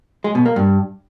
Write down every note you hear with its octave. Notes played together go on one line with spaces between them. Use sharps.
G#3
B2
A#3
G2